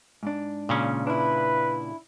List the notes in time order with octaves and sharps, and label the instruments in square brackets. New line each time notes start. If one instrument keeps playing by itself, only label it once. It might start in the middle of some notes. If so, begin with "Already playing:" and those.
[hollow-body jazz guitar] G#2 D4
[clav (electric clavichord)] A#2 C#3 C#4
[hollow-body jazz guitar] D4 E4 [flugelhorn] B4